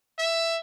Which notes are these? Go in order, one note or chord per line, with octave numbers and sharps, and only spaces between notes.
E5